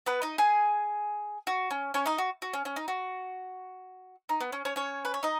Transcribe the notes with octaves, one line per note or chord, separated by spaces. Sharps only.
B3 B4
D#4 D#5
G#4 G#5
F#4
C#4
C#4 C#5
D#4 D#5
F#4
F#4
C#4
C#4
D#4
F#4
D#4
B3
C#4
C#4 C#5
C#4 C#5
B4
C#5
D#4 D#5